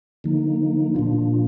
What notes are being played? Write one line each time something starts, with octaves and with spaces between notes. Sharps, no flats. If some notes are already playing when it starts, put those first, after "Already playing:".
D3 F3 A#3 D#4
A#2 F3 A#3 D4 F4